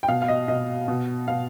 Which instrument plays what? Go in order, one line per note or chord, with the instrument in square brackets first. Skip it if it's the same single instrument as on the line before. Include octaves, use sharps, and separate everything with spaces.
[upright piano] G5
B2 F5
F5
D#5
B2 D#5
B2
B2 F5